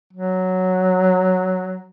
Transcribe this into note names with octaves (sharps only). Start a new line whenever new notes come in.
F#3